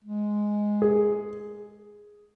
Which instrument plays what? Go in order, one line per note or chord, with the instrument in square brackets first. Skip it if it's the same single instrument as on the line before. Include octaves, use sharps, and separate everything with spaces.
[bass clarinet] G#3
[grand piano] G#4